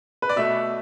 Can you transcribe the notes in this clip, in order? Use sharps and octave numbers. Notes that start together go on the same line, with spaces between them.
B4
D5
B2 A3 E5